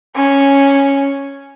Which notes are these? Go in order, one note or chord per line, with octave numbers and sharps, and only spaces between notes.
C#4